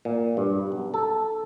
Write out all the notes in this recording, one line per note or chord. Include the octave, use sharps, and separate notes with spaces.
A#2
G2
B1
A4